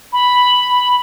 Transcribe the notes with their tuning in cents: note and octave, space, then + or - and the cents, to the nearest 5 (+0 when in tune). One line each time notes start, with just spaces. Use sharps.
B5 +0